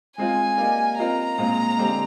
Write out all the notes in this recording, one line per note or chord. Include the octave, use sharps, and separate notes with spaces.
G#3 C4 F4 G#5
A#3 D#4 G4 D5 F5
C4 F4 A#4 D#5 A#5
A#2 G#3 C4 F4
D3 G#3 C4 G4